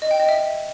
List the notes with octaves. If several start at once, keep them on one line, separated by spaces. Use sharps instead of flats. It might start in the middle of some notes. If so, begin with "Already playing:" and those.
D#5
G5
D#5
E5